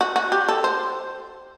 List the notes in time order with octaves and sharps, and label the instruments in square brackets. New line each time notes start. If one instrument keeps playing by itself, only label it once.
[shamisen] F#4
F#4
G4
A4
C5